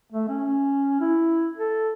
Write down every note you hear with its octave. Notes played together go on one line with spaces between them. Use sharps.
A3
C#4
E4
A4